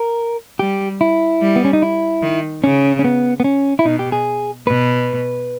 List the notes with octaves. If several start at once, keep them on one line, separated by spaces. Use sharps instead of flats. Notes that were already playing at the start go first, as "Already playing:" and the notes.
Already playing: A#4
G3 G4
E4
G3
B3
C#4
D#4
E4
D#3
C#3 C#4
C#4
B3
B3
C#4
E4
B2 D#4
G4
G#4
B2 B4